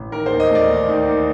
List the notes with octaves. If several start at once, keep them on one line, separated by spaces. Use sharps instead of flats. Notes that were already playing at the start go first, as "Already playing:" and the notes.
Already playing: A1
D#3 A#4
C5
D#2
D#5
A3 D5
D#2
D#3
D#2